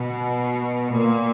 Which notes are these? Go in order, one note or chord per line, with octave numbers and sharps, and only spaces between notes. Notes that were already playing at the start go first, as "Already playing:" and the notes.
Already playing: B2
A#2